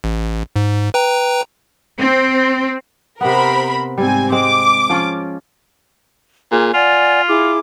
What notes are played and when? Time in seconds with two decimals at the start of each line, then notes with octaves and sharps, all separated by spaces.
0.04 A1
0.56 G#2
0.94 B4 G5 A#5
1.97 C4
3.21 C3 B3 A#4 C5 B5
3.98 G#2 G3 C4 G#5
4.32 G#3 C4 D6
4.89 F3 C#4 F4
6.52 A#2 G#4
6.74 F4 D5 F#5 G#5
7.29 E4 G#4 D6